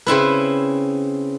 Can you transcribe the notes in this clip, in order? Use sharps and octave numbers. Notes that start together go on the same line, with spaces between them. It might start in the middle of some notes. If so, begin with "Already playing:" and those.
C#3 C4 E4 B4